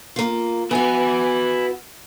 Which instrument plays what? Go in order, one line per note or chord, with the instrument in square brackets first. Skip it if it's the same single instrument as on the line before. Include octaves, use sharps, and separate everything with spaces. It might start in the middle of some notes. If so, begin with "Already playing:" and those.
[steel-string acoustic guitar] A#3 F4
[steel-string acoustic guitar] B3 F#4 [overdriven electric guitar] E4 G#5